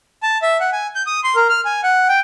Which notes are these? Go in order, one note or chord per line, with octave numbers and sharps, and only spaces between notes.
A5
E5
F#5
G#5
G6
D#6
C6
A#4
F6
G#5
F#5
G5